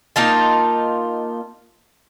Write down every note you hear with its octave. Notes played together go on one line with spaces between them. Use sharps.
A#3 D#4 F4 A5